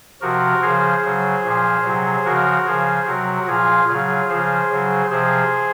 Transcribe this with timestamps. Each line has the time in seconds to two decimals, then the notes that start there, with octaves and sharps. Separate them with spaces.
0.21 C3 F3 F#4 A#4
0.62 C#3 F3 G#4 C5
1.03 C#3 F#3
1.44 A#2 F3
1.84 C3 F#3
2.25 C#3 F3 F#4 A#4
2.66 C#3 F3 G#4 C5
3.06 C3 F#3 F#4 A#4
3.47 A#2 F3 F4 G#4
3.88 C#3 F#3 F4 G#4
4.29 C#3 F3 G#4 C5
4.70 C#3 F#3
5.10 C3 F3 G#4 C5